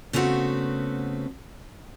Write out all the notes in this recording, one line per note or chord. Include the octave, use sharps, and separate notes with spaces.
C#3 A3 B3 C4 F#4